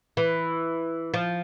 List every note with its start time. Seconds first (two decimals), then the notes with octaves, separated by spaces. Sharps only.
0.17 E3
1.14 F3